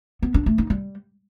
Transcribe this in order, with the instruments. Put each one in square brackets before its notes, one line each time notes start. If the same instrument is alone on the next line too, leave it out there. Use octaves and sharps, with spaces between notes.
[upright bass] B3
D4
A3
D#4
G3